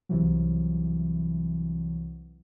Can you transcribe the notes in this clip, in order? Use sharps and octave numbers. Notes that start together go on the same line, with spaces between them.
C2 C3 E3 F#3